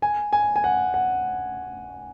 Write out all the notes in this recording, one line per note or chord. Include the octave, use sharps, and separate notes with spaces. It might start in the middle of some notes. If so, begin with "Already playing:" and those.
G#5
G#5
G#5
F#5
F#5